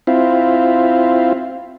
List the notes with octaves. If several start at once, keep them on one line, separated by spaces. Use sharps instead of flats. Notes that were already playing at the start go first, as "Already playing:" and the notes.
C4 E4 F4